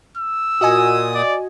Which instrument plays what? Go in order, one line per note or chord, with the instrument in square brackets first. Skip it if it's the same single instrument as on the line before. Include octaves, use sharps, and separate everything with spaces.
[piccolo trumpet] E6
[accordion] A#2 D#6 [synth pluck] F#4 D#5 G#5
[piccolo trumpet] D5